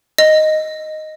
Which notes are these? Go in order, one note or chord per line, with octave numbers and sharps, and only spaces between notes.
D#5